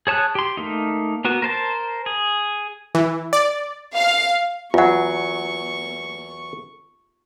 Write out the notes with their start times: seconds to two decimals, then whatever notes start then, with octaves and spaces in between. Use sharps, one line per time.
0.07 G#4 C#5 A5 D#6 F#6
0.35 G4 C6
0.57 A3 A#3 D#4
1.25 A#3 B3 F#4
1.42 A#4 C5 A5
2.06 G#4
2.95 E3
3.33 D5
3.96 F5
4.74 E2 F#3 F4 F#5 C#6